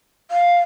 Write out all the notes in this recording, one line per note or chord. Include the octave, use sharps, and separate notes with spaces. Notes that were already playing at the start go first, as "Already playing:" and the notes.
F5